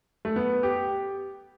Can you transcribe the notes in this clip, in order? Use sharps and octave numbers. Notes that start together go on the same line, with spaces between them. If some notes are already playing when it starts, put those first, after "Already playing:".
A3
B3
G4